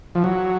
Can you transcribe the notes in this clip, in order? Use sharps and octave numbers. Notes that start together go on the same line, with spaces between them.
F3
F#3